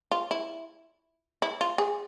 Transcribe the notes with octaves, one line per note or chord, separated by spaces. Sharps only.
F4
E4
E4
F4
G#4